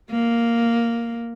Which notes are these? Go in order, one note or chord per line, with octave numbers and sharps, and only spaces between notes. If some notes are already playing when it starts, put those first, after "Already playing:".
A#3